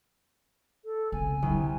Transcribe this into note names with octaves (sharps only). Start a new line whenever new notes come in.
A4
C#2 C3 G#5
C2 F2 D3